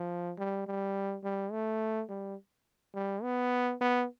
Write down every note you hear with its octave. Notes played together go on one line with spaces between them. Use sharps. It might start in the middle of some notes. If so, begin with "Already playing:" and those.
Already playing: F3
G3
G3
G3
A3
G3
G3
B3
B3